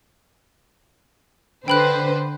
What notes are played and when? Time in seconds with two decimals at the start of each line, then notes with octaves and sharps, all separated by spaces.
1.68 D3 B4 C5 G5 B5 F#6